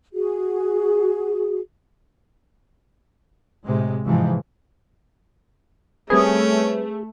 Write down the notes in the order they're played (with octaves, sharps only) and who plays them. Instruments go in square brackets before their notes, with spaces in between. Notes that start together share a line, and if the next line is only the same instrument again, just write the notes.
[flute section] F#4 G#4
[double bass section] A2 C3 G#3
G#2 C3 E3 F3 G#3
[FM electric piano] G3 C4 B4 [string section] A3 [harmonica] C#4 [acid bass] G#4